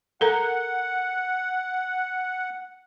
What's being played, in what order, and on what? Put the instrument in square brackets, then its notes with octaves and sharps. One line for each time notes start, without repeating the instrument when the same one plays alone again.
[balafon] A4 A#4 A#5 [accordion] F#5